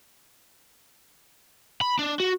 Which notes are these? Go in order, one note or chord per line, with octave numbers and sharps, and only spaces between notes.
B5
D4
F#4